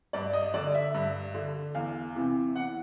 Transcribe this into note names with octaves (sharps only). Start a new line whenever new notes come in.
G2 D5
D#5
D3 D5
E5
G2
D3
E2 F5
C3 E3
E2 F#5